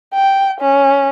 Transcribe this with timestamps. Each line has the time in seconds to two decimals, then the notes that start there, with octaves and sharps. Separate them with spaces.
0.14 G5
0.61 C#4